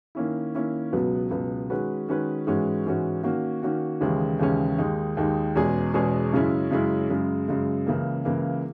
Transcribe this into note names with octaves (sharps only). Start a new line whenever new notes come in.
D#3 A#3 C#4 E4
D#3 A#3 C#4 E4
C#2 B2 F#3 B3
C#2 B2 F#3 B3
D#3 G#3 C#4 F#4 B4
D#3 G#3 C#4 F#4 B4
G#2 E3 G#3 C#4 F#4
G#2 E3 G#3 C#4 F#4
D#3 A#3 C#4 F#4
D#3 A#3 C#4 F#4
D#2 C#3 E3 G#3 C#4
D#2 C#3 E3 G#3 C#4
D#2 D#3 G#3 D#4
D#2 D#3 G#3 D#4
E2 B2 G#3 C#4 G#4
E2 B2 G#3 C#4 G#4
F#2 C#3 G#3 C#4 E4
F#2 C#3 G#3 C#4 E4
F#2 C#3 G#3
F#2 C#3 G#3
C#2 C#3 E3 A#3
C#2 C#3 E3 A#3